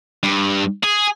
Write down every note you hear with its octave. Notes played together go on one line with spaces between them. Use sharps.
G2
G#4